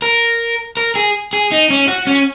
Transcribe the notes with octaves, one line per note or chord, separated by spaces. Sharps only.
A#4
A#4
G#4
G#4
D#4
C#4
F#4
C#4